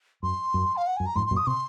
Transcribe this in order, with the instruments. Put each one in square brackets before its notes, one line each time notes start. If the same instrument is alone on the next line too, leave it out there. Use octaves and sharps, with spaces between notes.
[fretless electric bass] F#2 [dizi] C6
[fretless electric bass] F#2
[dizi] F5
F#5
[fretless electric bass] F#2 [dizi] G#5
[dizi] A#5
[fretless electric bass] F2 G#2 [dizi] C6
[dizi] C6
[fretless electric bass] F#2 A#2
[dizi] D#6
[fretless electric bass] C3 [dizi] C6